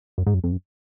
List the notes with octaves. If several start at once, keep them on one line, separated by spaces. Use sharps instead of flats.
F#2
G#2
F#2
F2
F#2